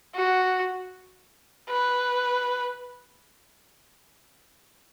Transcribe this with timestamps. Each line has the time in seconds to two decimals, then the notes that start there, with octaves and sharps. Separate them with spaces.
0.15 F#4
1.69 B4